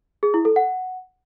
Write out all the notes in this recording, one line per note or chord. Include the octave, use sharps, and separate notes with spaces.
G#4
E4
A4
F#5